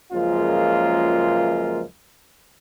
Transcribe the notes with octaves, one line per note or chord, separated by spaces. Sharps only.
C#2 F#2 F3 G#3 A#3 F4